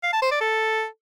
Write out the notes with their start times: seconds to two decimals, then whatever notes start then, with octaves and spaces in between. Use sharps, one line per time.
0.03 F5
0.13 A5
0.22 C5
0.31 D5
0.41 A4